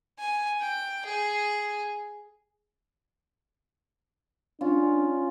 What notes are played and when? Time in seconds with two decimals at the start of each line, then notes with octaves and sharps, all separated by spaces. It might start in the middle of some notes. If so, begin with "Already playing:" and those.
0.18 G#5
0.60 G5
1.05 G#4
4.61 C#4 D4 F4